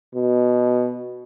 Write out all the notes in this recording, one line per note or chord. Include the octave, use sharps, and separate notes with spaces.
B2